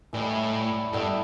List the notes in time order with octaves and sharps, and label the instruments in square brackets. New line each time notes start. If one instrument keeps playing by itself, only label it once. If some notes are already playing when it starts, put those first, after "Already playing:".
[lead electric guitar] A2 [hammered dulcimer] E3 G3 E4
[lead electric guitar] G2 [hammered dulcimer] G3 B3 E4 A4